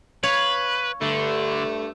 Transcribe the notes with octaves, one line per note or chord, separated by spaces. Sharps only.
B4 C#5 F5
G2 D3 A3